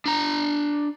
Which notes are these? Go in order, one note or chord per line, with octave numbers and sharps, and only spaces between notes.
D4 A#5